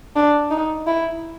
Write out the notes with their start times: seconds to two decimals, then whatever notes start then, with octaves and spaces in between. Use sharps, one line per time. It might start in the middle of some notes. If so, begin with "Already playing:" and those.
0.16 D4
0.51 D#4
0.87 E4